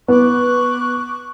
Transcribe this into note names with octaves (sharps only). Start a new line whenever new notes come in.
B3 C#6 D6 F#6